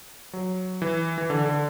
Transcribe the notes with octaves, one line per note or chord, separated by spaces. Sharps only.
F#3
E3
E3
D3
D3